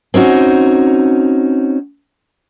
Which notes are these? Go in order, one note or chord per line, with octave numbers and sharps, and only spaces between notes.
C4 C#4 D#4 F#4